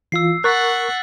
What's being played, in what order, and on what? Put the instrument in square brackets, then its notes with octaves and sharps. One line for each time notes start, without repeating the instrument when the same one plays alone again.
[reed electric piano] E3 F4 [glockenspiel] E6 C7
[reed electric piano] A#4 C#6 [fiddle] F#5 [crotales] F#6 A6 B6